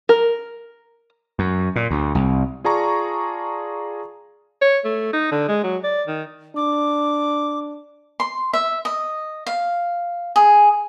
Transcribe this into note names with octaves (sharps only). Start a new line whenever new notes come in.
A#4
F#2
A#2
D2
C2
F4 G#4 D5 A5 A#5 C#6
C#5
A3
D#4
D3
G#3
F#3
D5
D#3
D4 D6
C6
E5
D#5
F5
G#4